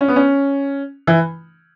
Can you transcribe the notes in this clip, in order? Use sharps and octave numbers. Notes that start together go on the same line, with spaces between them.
C#4
B3
C#4
E3